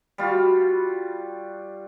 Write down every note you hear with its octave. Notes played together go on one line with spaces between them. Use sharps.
G3 F4 F#4